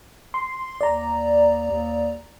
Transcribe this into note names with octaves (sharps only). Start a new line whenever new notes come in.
C6
D#2 D5 A#5
D#2